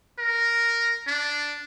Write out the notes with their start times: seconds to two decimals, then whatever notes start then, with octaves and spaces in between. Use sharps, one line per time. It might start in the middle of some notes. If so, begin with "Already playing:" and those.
0.19 A#4
1.07 D4